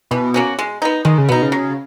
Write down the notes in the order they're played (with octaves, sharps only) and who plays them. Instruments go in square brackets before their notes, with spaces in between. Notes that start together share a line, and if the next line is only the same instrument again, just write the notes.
[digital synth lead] B2 [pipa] E3
[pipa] A#3 C#4 F#4
G#3
B3 D#4
[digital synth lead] D#3 [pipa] G#3
[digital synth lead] C#3
[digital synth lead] B2 [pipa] B3 D#4
[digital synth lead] C#3
[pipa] F#3